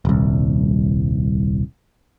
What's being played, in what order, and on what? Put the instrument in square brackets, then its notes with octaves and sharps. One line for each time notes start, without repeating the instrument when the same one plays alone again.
[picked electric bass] D#1 C2